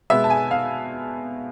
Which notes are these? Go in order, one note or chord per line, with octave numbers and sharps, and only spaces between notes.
B2 G#3 B3 E5
A5
G#5
F5